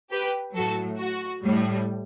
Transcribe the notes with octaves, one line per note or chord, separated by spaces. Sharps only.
G4 B4
A2 F#3 A3 F#4 A4
F#4
A2 G3